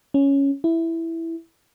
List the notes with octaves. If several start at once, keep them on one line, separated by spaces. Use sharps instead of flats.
C#4
E4